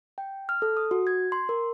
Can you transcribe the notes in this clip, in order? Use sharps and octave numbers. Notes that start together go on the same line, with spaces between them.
G5
F6
A4
D#6
F#4
G#6
C6
A#4